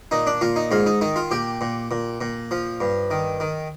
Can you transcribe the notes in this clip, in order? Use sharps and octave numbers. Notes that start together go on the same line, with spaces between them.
A#2 D#4
D4
A#2 F4
D#4
G#2 F4
D#4
D#3 D#4
F4
A#2 G4
A#2
A#2
A#2
F3
G2
D#3
D#3